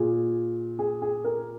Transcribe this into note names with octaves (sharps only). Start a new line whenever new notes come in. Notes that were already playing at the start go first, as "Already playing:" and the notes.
Already playing: A#2 G#4
G#4
G#4
A#4